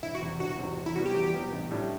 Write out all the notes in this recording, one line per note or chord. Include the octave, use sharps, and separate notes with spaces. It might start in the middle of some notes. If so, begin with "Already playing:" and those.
E1 E4
F#4
E2 C3
E1 F#4
E2 C3
E2
E4
C3 G3 B3 F#4
G4
E2
C3 G3 B3
A1
A2 G3 D4